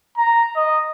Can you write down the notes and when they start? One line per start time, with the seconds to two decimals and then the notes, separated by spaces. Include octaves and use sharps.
0.18 A#5
0.56 D#5